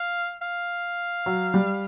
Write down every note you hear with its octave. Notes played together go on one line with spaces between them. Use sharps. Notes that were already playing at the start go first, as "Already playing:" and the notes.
Already playing: F5
F5
F#3
G3